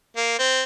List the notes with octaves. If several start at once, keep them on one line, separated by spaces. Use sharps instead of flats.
A#3
C4